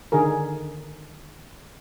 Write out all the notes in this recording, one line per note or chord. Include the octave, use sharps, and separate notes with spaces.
D3 D#3 G#4 A#4